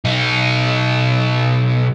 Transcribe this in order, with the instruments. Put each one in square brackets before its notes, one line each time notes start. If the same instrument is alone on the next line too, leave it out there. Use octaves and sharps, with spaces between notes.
[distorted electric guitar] B1 D#4